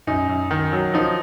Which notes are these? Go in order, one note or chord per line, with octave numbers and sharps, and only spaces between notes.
F#2 D#4
F#2
D#3
F#3
F3 D#4